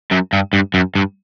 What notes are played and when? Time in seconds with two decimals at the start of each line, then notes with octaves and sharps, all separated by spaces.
0.11 F#2
0.33 G2
0.53 G2
0.74 F#2
0.95 G2